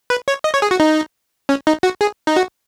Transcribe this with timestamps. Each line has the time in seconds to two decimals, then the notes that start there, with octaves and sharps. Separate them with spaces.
0.10 B4
0.28 C#5
0.44 D#5
0.54 C#5
0.62 G#4
0.71 F#4
0.80 D#4
1.49 C#4
1.67 D#4
1.83 F#4
2.01 G#4
2.27 D#4
2.36 F#4